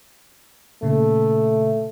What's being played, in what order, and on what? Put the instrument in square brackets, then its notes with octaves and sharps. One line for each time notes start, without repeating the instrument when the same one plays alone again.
[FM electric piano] A#2 C#3 [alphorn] A3